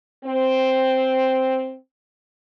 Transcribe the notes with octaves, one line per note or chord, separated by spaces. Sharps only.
C4